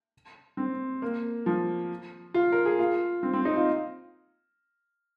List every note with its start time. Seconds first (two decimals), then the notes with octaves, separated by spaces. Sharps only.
0.57 C4
1.02 A#3
1.46 F3
2.34 F4
2.52 A#4
2.65 G#4
2.79 F4
3.23 C4
3.33 C4
3.45 D#4
3.56 F4